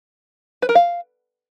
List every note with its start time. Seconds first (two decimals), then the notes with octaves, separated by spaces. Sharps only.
0.62 B4
0.69 A#4
0.75 F5